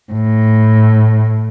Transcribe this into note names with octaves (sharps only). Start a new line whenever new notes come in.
A2